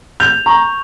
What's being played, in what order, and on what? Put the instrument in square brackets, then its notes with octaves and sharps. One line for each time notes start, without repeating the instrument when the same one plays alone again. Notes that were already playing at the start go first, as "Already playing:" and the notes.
[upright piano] G6 [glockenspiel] F7
[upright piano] A#5 [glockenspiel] C#6